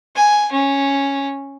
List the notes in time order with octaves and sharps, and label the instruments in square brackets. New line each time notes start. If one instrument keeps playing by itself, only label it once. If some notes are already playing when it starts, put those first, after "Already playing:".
[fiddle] G#5
C#4